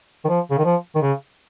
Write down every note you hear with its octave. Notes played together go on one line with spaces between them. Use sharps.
D#3
F3
C#3
D#3
F3
D#3
C#3